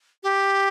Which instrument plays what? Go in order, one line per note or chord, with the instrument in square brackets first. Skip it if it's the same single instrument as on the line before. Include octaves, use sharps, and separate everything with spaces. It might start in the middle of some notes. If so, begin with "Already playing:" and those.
[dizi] G4